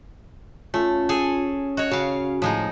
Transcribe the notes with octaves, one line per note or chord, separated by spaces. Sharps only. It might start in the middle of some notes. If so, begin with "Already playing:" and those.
A3 C#4 F4
G#4 A4 G#5
F#4 C#5 D#5
C#3 F#4 F5
A2 F3 G#3 D#4